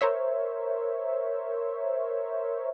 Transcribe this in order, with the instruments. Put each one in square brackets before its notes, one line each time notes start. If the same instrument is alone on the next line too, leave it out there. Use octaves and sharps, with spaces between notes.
[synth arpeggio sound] A#4 C5 C#5 E5